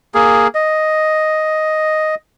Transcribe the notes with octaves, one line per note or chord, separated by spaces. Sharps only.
A#3 G#4
D#5